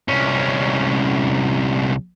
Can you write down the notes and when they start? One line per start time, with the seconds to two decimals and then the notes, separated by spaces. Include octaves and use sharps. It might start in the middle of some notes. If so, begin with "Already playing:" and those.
0.09 C2 C#4